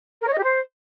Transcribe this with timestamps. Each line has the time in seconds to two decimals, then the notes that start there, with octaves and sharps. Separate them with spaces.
0.21 A#4
0.27 C#5
0.33 D#5
0.39 G4
0.45 C5